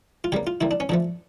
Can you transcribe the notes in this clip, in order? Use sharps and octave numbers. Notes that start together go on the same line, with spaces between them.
F4
C#3 G3 A#3 G4
F4
D3 G3 A#3 E4
D4
C#4
D3 F3 A3 D4